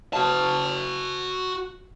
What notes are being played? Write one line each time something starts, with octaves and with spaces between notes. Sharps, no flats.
F#4 A5